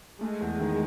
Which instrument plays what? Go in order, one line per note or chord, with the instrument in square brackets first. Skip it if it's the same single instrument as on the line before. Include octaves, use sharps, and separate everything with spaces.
[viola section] G#3 [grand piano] A3
[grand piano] E2
D#3